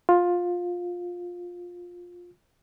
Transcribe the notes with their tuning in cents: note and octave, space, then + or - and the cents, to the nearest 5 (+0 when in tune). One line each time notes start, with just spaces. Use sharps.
F4 +15